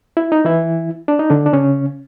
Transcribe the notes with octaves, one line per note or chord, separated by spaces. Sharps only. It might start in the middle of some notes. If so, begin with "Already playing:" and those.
E4
D#4
E3 E4
D4
D#4
D3 D4
D4
C#3 C#4